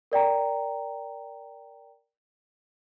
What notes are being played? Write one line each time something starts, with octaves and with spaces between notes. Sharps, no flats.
A#4 D5 G5 A#5